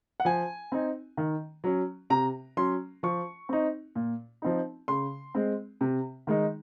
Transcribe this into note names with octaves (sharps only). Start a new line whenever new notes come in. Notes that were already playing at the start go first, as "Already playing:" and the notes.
F#5
F3 G#5
C4 D#4
D#3
F#3 C#4
C3 A#5
F#3 C#4 C6
F3 C#6
C4 D#4
A#2
F3 C4 D#4
C#3 C6
G#3 C4
C3
D#3 G#3 D#4